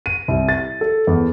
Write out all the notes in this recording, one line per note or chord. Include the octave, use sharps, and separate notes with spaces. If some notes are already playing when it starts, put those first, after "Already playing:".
D#7
C2
A6
A4
E2